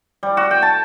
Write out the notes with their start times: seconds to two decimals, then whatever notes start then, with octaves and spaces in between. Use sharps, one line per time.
0.23 G3
0.37 F#4
0.51 G5
0.62 A5